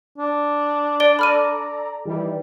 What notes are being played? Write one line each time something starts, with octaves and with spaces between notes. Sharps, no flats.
D4
D5 D7 G7
A4 D5 A#5 B5 F6 D#7
D#3 E3 G3